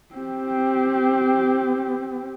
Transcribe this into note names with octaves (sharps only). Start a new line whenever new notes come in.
C4 G4